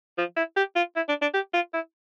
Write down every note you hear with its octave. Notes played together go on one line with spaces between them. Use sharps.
F3
E4
G4
F4
E4
D4
D4
G4
F4
E4